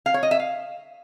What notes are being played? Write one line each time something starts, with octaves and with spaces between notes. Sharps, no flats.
F5
C#5
D#5
E5
F5